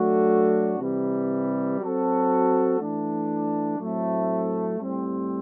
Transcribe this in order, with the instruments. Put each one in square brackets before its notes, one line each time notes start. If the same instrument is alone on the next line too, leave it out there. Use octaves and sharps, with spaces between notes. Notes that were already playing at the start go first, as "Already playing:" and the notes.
Already playing: [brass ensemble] F#3 A3 D4 F#4 A4
C3 E3 G3
F#3 C4 F#4 A4
E3 A3 D4
A2 F#3 A3 C4
A2 G3 C4 G4